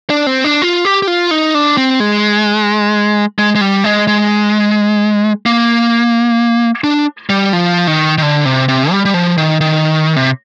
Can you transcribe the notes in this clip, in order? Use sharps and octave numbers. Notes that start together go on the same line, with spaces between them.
D4
C4
D4
F4
G4
G4
F4
D#4
D4
C4
G#3
G#3
G#3
G3
G#3
G#3
A#3
D4
G3
F3
D#3
D#3
D3
C3
C3
G3
G3
F3
D#3
D#3
C3